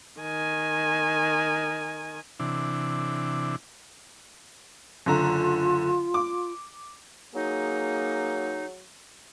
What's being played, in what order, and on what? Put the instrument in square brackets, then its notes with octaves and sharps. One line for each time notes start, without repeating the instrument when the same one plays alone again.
[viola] D#3 G#5
[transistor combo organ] C3 E3 D4
[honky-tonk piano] F#1 D3 A#5 [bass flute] F4
[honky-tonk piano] D6
[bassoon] F#3 [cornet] A#3 [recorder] D#4 [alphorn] G#4